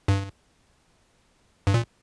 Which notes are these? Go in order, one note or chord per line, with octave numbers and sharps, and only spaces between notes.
G2
G2
A#2